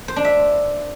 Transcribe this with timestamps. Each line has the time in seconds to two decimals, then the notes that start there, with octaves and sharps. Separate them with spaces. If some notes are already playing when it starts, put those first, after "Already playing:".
0.08 C5
0.16 D4
0.25 E5